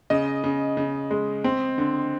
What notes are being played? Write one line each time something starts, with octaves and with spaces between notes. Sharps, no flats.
C#3 D#5
C#3
C#3
G#3
C4
D3